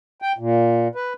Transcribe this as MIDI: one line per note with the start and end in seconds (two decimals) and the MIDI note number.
0.22 0.32 79
0.38 0.88 46
0.95 1.13 71